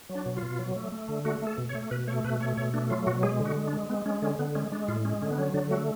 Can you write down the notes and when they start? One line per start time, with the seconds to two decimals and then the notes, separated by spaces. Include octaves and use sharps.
0.09 F#3
0.15 D4
0.26 B2
0.37 F4
0.42 B2
0.59 F#3
0.76 A3
0.92 A3
1.09 D3
1.25 A3 F#4
1.41 A3
1.47 A4
1.58 B2
1.69 C#5
1.75 A3
1.91 B2 B4
2.07 A3 C#5
2.24 B2 B4
2.40 A3 C#5
2.57 B2 C#5
2.74 A3 D4
2.90 F#3 F4
3.07 B2 F#4
3.23 G#3 G#4
3.39 D3
3.45 F#4
3.56 G#3
3.68 D4
3.73 G#3
3.89 G#3 B3
4.06 G#3 C#4
4.22 D3 C#4
4.39 D3 B3
4.55 G#3 C#4
4.72 G#3 D4
4.88 A2 F4
5.05 G#3 C#4
5.22 D3 C#4
5.31 B3
5.38 F#3 C#4
5.54 D3 D4
5.71 A3 F#4